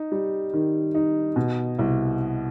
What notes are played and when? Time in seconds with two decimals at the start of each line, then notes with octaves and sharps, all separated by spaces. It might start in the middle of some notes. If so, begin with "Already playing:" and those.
Already playing: D#4
0.12 G3
0.53 D#3
0.94 D#4
1.36 B2
1.79 C2